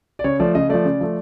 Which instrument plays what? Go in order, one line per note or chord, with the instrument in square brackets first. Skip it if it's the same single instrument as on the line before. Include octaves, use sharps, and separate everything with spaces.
[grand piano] D5
C#3 C#5
F3 A3 D5
C#3 D#5
F3 A3 D5
C#3
F3 A3